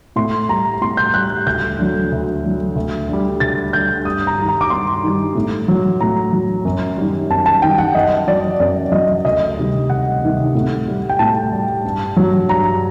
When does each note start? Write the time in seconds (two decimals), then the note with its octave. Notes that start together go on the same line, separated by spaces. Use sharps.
0.16 A2 C6
0.49 G3 A#5
0.81 A2 C6
0.97 G6
1.14 G3 F#6
1.46 D2 G6
1.79 D3 F#3
2.12 D2
2.44 D3 F#3
2.76 D2
3.09 D3 G3
3.40 D2 A6
3.73 D3 G3 G6
4.05 G2 D#6
4.27 A#5
4.38 D#3 G3
4.48 A#5
4.61 D6
4.70 G2 C6
5.04 D#3 G3
5.35 A2
5.68 F#3
6.00 A2 A#5
6.33 F#3
6.65 F#2
6.97 D#3 G3
7.30 F#2 A5
7.46 A5
7.62 D#3 G3 G5
7.78 F#5
7.95 F#2 D#5
8.27 F#3 D5
8.60 F#2 D5
8.92 F#3 D#5
9.25 D2 D#5
9.57 C3 D#3 G3
9.89 D2 F#5
10.22 C3 D#3 G3
10.55 A2
10.87 G3
11.09 G5
11.19 A2 A5
11.52 G3
11.85 G2
12.17 F#3
12.49 G2 A#5